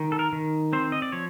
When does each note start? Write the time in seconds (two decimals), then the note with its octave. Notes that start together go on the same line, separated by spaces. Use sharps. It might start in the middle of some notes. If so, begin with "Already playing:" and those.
Already playing: D#3
0.12 A4
0.19 A#4
0.33 D#3
0.73 C4 C5
0.92 D#5
1.02 D5
1.12 F3 C#5